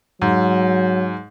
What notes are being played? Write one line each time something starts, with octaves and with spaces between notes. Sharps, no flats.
G#2 F#3